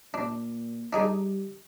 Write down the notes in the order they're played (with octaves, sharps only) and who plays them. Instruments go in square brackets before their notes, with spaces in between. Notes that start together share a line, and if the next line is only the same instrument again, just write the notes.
[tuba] A#2 [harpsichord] D4
[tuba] G3 [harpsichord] D4 D#4 G#4